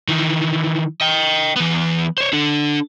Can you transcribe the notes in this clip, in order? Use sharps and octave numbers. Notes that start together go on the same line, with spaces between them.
D#3 E3
D#5 G5
E3 B3
C5 C#5
D4 A4